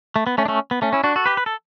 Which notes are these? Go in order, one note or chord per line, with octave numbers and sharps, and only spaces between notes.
A3
B3
A3 C#4
D4
A3 C#4
B3
A3 C#4
C#4 E4
D4 F#4
F#4 A4
G4 B4
B4
A4